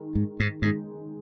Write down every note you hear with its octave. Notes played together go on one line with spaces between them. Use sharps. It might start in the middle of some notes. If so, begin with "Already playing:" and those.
Already playing: D#3 G#3
G#2
G#2
G#2 D#3 G#3 D#4